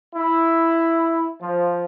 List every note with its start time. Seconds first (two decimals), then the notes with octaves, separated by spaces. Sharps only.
0.15 E4
1.41 F3